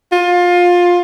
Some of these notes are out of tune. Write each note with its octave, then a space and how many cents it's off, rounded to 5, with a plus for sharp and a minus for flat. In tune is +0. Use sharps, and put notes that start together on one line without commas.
F4 +20